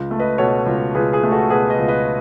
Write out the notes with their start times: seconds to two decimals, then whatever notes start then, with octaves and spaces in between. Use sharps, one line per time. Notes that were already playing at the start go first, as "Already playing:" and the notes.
Already playing: C#2
0.11 A3
0.19 B4 D#5
0.38 B2 A4 C#5
0.66 C#2
0.95 C#2 G#4 B4
1.13 G#4
1.23 A3
1.32 F#4 A4
1.50 B2 G#4 B4
1.70 B4 D#5
1.79 C#2
1.88 B4 D#5